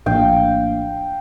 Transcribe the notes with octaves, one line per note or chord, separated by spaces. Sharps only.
A#1 A2 F3 A#3 D4 F5 G5